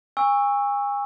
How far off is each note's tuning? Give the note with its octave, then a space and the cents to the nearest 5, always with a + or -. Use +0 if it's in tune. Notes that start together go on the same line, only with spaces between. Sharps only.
G#5 -35 C#6 +0 E6 +0